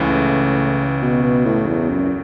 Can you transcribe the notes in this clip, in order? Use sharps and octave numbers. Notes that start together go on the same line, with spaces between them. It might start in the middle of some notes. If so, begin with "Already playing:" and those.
Already playing: C#2 A2 C#3 E3
B2
B2
A2
E2
F#2